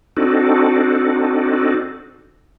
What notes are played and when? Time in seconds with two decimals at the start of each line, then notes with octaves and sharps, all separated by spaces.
0.17 C4 D4 D#4 F#4 A4